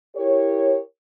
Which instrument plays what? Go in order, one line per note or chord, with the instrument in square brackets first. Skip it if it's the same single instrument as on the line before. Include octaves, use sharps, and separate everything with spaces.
[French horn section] E4 G4 A#4 C#5